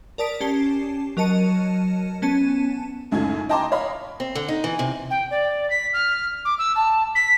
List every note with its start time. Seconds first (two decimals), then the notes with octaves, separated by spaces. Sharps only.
0.18 A#4 D5 A5 D#6 B6 D7
0.40 C#4 G4 A5 C7
1.17 F#3 A#4 D#5 A5 C#7 D#7
2.22 B3 C#4 A5 D#7
3.11 C#2 F#2 A2 D#4 A4 G#6
3.49 D#5 G5 A5 A#5 C6 D6
3.72 C#5 D#5 F5 A#5 B5
4.20 C4
4.35 D3
4.48 D#4
4.64 E3
4.79 C3
5.10 G5
5.30 D5
5.70 B6
5.93 F6
6.45 D6
6.58 E6
6.75 A5
7.15 B6